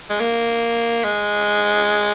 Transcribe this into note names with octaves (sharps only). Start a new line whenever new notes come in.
G#3
A#3
G#3